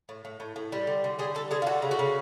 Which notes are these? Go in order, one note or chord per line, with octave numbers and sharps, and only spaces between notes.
A2
A2
A2
A2
G3
D3
D3
G3 G#4
G3 A4
D3 G#4
F4
A3 F#4
C#3
F#4
C#3